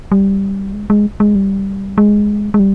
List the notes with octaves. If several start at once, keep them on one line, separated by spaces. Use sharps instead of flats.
G3
G#3
G#3
G#3
G3
G#3
G#3
G3